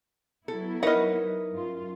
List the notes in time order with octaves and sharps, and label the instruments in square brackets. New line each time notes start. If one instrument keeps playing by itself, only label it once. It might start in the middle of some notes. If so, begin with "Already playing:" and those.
[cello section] F#3 B3 E4 [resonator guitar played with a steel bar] A4
[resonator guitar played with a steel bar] D#4 B4 C#5 [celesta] A#4 E5 F6 [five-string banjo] D#5 F#5
[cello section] F#2 F4